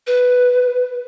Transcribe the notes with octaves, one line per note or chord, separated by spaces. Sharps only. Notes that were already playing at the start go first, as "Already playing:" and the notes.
B4